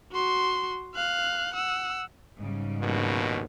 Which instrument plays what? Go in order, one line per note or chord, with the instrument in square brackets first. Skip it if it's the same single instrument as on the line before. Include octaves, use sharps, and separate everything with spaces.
[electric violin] F#4 C6
F5 F#6
F#5 E6
[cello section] G#2 C#3 G3
[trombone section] A#1 D#2 B2